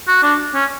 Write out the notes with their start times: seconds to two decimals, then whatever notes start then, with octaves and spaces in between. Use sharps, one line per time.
0.08 F#4
0.23 D4
0.54 C#4